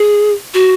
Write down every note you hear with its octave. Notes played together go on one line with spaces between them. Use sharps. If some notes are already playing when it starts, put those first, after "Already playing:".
Already playing: G#4
F#4